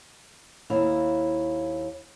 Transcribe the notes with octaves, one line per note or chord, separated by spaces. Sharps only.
D#2 E4 F5